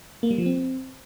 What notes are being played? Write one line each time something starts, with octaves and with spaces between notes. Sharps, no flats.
A#3
G3
F3
C4